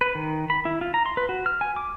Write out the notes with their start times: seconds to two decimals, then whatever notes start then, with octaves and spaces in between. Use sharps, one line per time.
0.01 B4
0.15 D#3
0.50 B5
0.65 E4
0.81 F4
0.94 A#5
1.06 C6
1.17 B4
1.29 F#4
1.46 F6
1.61 G#5
1.76 D6